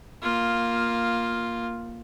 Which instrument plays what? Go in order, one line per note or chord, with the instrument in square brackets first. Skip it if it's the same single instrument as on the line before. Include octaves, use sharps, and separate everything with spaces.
[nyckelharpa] A#3 F4